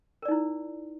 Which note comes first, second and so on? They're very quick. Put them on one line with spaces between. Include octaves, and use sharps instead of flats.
A#4 D5 D#4 E4